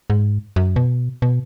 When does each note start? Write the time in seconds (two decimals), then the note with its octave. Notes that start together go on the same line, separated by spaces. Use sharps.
0.10 G#2
0.56 F#2
0.76 B2
1.22 B2